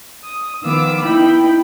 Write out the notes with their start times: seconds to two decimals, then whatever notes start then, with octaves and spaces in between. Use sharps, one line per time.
0.25 D#6
0.63 D#3 F3 B3 F5 D6 E6
1.03 B3 D#4 E4 G5 B5